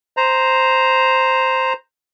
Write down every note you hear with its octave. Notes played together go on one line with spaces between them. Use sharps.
C5 A#5